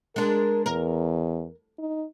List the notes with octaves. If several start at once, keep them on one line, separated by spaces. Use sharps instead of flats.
G#3 D4 A#4
E2 A#4
D#4